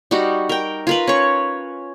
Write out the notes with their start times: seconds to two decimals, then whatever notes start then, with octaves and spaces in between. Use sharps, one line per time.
0.11 G3 D#4 F#4
0.49 A#4 G5
0.87 F4 A#4 B4
1.07 C#4 C#5